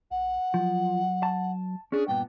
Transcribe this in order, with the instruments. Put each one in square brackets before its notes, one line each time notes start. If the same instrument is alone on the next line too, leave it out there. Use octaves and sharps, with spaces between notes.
[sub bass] A#1 [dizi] F#5
[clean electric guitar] F3 [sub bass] F#3
[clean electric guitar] A5
[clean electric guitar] C#4 D4 [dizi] G#4
[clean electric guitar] G2 A#2 B3 [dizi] G5